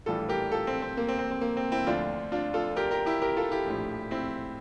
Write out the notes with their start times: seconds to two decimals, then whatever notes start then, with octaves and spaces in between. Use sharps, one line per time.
0.06 A#1 A2 E3 G3 F4 A4
0.29 G4 A#4
0.52 F4 A4
0.67 C4
0.82 C4
0.97 A#3
1.08 C4
1.19 C4
1.31 C4
1.41 A#3
1.57 C4
1.72 C4 E4
1.87 D2 D3 F3 D4 F4
2.32 D4 F4
2.54 F4 A4
2.76 G4 A#4
2.91 G4 A#4
3.06 E4 G4
3.22 G4 A#4
3.37 F4 A4
3.51 E4 G4
3.66 A#1 A2 F3
4.11 C4 E4